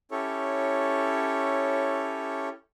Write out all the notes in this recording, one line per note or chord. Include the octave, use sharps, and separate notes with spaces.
C#4 E4 G4 A4 C#5